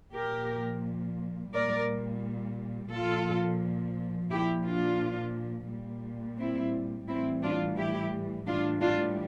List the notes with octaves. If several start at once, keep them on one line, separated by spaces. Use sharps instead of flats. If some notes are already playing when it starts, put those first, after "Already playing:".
A#2 F3 G4 A#4
A#2 G3 A#4 D5
A#2 F3 F4 A4
A#2 F3 E4 G4
D4 F4
A#2 G3
C4 E4
A2 E3 G3 C4 E4
D4 F4
E4 G4
A2 E3 G3 D4 F4
D4 F4